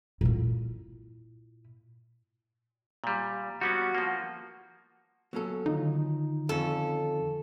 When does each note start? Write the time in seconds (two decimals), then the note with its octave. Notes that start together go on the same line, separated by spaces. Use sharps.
0.21 A#2 E4
3.04 A#2 G3
3.61 G3 B3 C#4 F#4
3.95 F3 A#3
5.33 F#3 A#3 B3 C#4 A4
5.66 D3 D#3 D#4 F4
6.49 F2 C#4 A4